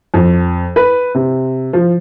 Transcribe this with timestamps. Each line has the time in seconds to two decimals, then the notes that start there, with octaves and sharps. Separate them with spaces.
0.14 F2
0.76 B4
1.15 C3
1.73 F3